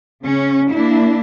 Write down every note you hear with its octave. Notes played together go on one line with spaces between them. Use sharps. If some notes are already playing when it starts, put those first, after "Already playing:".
C#3 C#4
A#3 D4 E4